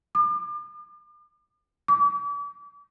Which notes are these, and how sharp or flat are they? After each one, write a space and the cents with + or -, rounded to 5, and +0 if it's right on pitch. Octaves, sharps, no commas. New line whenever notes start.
D6 +40
D6 -40